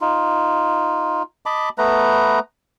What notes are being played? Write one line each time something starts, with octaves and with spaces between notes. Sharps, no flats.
D#4 F4
D#5 A5 B5 D6
A3 B3 B4 A#5